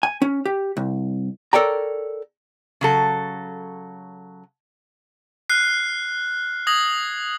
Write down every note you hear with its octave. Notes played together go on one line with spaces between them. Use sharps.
G#5
C#4
G4
C2
A4 A#4 C#5 D5 G5 A#5
C#3 F#3 A4
F6 F#6 C7
D#6 G#6 A#6 F#7